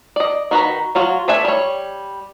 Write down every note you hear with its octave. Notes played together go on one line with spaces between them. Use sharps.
D5 D#5
D#3 F#4 B4 A#5
F#3 F4 F#4
A3 D4 B4 E5 G#5
G3 C#5